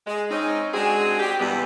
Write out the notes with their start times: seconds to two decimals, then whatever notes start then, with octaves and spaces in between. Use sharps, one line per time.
0.07 G#3
0.31 G#3 C4 C#4 D#4
0.74 G#3 C4 D4 F#4 G#4
1.20 G4
1.40 E2 C3 E3 G3 B3